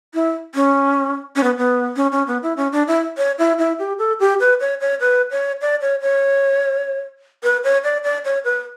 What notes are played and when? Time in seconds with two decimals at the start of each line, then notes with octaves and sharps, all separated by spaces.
0.14 E4
0.55 C#4
1.36 C#4
1.43 B3
1.58 B3
1.96 C#4
2.12 C#4
2.27 B3
2.43 E4
2.57 C#4
2.72 D4
2.88 E4
3.18 C#5
3.39 E4
3.59 E4
3.79 G4
3.99 A4
4.20 G4
4.40 B4
4.60 C#5
4.81 C#5
5.01 B4
5.31 C#5
5.62 D5
5.81 C#5
6.01 C#5
7.43 B4
7.64 C#5
7.84 D5
8.04 D5
8.25 C#5
8.45 B4